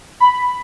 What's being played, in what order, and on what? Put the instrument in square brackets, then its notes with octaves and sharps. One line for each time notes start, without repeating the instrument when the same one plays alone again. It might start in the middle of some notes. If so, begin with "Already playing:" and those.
[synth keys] B5